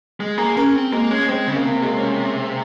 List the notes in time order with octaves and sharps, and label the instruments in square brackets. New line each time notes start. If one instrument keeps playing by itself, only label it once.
[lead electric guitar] G#3
[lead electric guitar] A#3 [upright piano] G#4
[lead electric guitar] C#4 [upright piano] A#4
[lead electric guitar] C4
[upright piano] G#3 [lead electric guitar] A#3
[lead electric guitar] G#3 [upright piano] C#4
[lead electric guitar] G#3 [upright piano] C4
[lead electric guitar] C#3
[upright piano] A#3
[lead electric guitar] C3
[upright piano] A#3
G#3
C#4